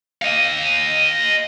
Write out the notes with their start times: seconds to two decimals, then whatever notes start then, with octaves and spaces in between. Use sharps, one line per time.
0.22 D#5 F5